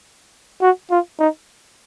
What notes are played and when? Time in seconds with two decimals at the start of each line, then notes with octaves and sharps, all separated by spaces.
0.62 F#4
0.91 F4
1.19 D#4